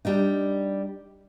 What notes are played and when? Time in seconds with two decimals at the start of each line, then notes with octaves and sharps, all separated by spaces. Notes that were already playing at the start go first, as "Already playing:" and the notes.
0.05 G3 D4 D#4